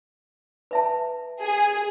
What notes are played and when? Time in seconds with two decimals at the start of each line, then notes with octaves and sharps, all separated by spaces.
0.71 B4 E5 A5
1.42 G#4